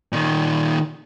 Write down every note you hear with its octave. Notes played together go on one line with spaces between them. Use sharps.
A#2 D#3